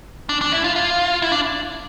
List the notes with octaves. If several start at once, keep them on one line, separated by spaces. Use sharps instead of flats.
D4
D4
E4
F4
F4
E4
D4